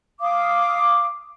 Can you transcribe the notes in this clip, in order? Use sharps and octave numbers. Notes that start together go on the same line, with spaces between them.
F5 D6 D#6